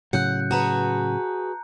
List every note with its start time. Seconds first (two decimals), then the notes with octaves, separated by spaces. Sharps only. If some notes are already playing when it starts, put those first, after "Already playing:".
0.13 A2 C#3 F#3 F#5 F#6 G6 C#7
0.51 F#4 G#4 B4 A5 A#5